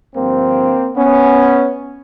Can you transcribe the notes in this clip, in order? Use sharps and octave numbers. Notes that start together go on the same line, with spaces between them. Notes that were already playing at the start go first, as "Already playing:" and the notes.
G2 D3 F3 A#3 C4
B3 C#4